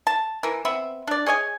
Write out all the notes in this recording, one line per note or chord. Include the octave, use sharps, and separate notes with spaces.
A5
E3 A#4
B3 C4 E5 B5
D4 D5
G#4 C#5 D#5 G#5